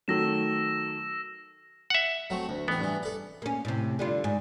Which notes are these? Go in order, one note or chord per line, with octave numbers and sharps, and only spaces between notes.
D#3 F#3 A3 E6 A#6 E7
E5 F#5
F#3 A3 C4
D2
A1 B3 C4
G2 E3
A4 D5
A#3 C#4
A2 C3
D3 G3 F4
G#2